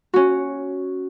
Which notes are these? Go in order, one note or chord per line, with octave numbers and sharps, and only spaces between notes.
C#4 F#4